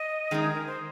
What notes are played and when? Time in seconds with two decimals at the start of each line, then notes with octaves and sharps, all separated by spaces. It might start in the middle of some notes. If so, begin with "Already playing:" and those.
Already playing: D#5
0.31 D#3 G#3 D#4
0.43 G#4
0.54 A#4
0.66 C5